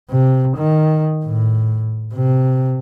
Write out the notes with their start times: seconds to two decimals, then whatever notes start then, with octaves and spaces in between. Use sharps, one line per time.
0.10 C3
0.57 D#3
1.24 A2
2.14 C3